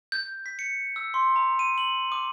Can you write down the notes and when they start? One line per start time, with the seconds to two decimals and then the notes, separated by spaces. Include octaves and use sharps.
0.12 G6
0.46 B6
0.59 C#7
0.96 E6
1.14 C6
1.36 A#5
1.59 D#7
1.78 F#7
2.12 D6